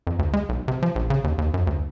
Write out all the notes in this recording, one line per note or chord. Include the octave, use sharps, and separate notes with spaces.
F2
D2
G#3
B1
C3
F3
A#1
C#3
D#2
D#2
F#2
D2